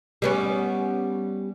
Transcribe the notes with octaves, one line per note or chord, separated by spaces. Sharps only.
G3 B3 C#4